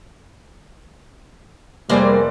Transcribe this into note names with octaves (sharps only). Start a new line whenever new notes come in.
F1 G3 A#3 G#4 C5 D5